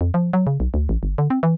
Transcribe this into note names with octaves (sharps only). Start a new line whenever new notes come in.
F2
F3
F#3
C#3
B1
D2
A1
G1
D3
C4
E3